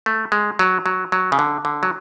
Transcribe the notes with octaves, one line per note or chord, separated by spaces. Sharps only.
A3
G#3
F#3
F#3
F#3
C#3
D3
D3
F#3